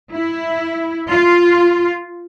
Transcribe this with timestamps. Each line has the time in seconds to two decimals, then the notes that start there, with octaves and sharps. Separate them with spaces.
0.13 E4
1.10 F4